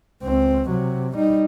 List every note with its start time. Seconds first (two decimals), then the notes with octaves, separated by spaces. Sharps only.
0.23 C#2 C4
0.70 C3 F#3
1.15 G3 D#4